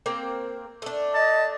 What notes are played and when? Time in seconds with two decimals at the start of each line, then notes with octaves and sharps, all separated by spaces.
0.06 A#3 C4 A#4
0.82 A3 D4
1.14 D#5 A5